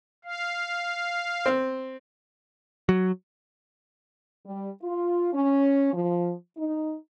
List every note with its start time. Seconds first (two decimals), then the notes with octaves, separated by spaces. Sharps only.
0.25 F5
1.46 C4
2.89 F#3
4.45 G3
4.82 F4
5.33 C#4
5.93 F3
6.57 D#4